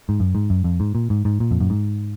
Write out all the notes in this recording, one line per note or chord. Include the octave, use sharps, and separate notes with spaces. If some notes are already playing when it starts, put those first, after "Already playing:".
G#2
F#2
G#2
F#2
F2
G#2
A#2
G#2
G#2
A#2
F2
F#2
G#2